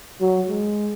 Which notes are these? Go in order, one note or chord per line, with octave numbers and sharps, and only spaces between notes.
F#3
G#3